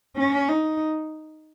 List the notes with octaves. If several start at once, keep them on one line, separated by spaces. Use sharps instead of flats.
C#4
D#4